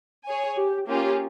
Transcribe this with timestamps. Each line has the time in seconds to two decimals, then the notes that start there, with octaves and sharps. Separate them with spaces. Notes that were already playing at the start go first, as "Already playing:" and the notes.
0.24 G#4 C#5 G#5
0.56 G4
0.87 A#3 C#4 F4 G4 G#4